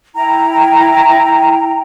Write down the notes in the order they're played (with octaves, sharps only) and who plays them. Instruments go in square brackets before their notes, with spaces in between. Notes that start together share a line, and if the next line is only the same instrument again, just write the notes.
[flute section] E4 G5 A#5